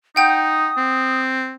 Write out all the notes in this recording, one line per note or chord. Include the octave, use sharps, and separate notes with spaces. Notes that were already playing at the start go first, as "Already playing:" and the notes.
D#4 F#5 G5 D#6 G6
C4